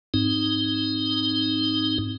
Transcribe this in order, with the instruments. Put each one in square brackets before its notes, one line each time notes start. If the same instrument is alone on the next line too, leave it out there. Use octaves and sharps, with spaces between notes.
[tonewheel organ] G#2 C4 D#4